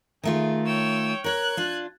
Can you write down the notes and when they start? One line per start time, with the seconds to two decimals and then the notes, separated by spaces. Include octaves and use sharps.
0.24 D#3 A3 F4 G#4
0.65 C#5 G5 E6
1.24 A#4 C#5 F#6 G#6
1.57 D4 F4